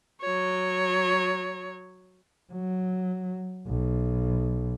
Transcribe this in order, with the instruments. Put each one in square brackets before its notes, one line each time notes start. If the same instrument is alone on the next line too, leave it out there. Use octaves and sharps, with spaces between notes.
[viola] F#3 C#5
[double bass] F#3
B1